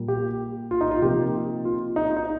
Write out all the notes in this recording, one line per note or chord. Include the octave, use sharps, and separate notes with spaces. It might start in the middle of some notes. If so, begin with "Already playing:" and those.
Already playing: A#2 G3 A#3
G4
F4
D#4
F4
C3 F3 A#3 D#4 G4
F4
D#4
D#4